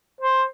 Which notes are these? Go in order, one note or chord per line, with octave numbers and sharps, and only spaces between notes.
C5